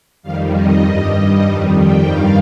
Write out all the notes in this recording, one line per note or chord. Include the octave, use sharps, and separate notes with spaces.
F2 D#3 G3 F5
D#5
G2 G3 D#5
F2 D#3 G3
G5
G2 D#3 G3 F5